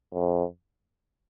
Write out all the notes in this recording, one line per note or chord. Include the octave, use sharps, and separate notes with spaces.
F2